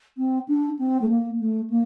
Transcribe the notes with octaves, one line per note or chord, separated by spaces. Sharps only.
C4
D4
C4
A3
A#3
A3
A#3